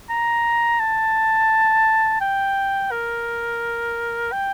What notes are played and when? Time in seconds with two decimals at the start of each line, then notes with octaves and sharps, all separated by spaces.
0.10 A#5
0.80 A5
2.21 G5
2.91 A#4
4.32 G5